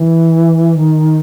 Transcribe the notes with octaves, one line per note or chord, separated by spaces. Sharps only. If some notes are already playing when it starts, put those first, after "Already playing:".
Already playing: E3
D#3